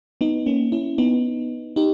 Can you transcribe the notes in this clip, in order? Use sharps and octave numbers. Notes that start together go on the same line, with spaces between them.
B3 D#4
A#3 C#4
C#4 E4
B3 D#4
D#4 G4